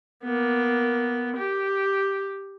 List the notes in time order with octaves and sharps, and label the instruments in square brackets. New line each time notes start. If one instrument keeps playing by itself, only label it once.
[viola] A#3 B3
G4